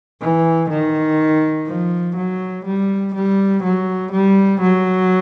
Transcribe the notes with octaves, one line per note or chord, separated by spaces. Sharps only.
E3
D#3
F3
F#3
G3
G3
F#3
G3
F#3